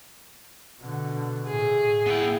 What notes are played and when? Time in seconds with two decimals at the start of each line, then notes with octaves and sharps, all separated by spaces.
0.82 B2 D3
1.47 A2 G#4
2.07 B3 E4 G5